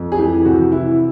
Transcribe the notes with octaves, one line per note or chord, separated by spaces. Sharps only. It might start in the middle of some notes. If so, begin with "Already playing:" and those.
Already playing: F2
G#4
E3 G4
C3 F#4
E3 E4